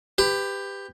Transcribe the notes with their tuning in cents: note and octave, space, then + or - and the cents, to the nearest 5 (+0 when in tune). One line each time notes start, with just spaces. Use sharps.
G4 +15 B4 +25